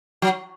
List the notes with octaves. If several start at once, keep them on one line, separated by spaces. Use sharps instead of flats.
F#3